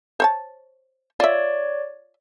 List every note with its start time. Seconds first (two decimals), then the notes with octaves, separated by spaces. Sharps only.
0.20 C5 C#5 A5
1.20 F4 C#5 D5 E5